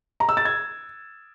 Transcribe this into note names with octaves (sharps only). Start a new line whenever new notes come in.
A#5
E6
A6
G#6